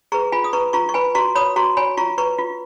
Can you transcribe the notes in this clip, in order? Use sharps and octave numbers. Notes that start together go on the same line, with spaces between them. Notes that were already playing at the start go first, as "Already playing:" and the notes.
G#4 B4 A#5 C#6
F4 G#5 B5
D#6
B4 A#5 C#6
F4 A#5 C#6
C#6
B4 G#5 B5
F#4 A#5 C#6
C#5 B5 D#6
F#4 A#5 C#6
C#5 G#5 B5
F4 A#5 C#6
B4 A#5 C#6
F4